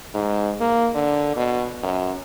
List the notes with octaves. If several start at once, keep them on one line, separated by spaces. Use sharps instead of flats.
G#2
A#3
D3
B2
F#2